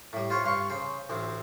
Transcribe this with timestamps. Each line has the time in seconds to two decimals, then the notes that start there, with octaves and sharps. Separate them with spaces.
0.13 A2 G3
0.30 F4 C5 C#5
0.45 G2 F5 C6 C#6
0.70 C#3 C5
1.10 A1 D2 C4